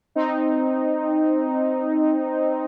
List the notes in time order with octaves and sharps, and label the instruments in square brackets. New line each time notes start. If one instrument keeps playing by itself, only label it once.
[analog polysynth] C4 D#4